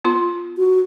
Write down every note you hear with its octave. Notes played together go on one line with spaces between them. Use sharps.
B3 F4 C6
F#4